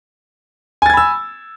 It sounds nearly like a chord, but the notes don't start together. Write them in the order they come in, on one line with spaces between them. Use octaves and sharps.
G#5 A6 G#6 B5 E6